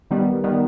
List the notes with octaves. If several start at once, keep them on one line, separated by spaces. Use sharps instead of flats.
D#3 G3 B3
D#3 G3 B3